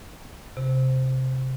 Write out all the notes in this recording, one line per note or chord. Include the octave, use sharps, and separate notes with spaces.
C3